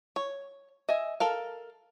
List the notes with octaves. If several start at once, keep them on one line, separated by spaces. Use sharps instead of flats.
C#5
D#5 E5 G#5
A4 A#4 F5